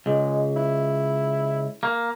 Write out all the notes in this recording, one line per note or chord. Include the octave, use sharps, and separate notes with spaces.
C#2 G#3
E4
A#3